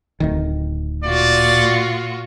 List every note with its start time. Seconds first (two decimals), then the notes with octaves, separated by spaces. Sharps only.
0.20 D1 D2 D#3
1.04 A#2 F4 F#4 D5